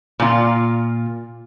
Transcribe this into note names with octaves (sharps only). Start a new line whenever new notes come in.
A#2 F4